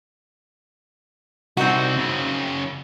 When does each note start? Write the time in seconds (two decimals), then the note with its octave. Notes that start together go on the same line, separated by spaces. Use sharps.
1.57 C2 C3 C4 D#4 F#4
1.97 F#2 C#3